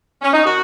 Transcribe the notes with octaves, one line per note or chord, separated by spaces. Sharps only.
C#4
D#4
D#3 F#4